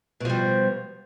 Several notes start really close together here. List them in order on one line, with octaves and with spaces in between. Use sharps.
B2 F3 G3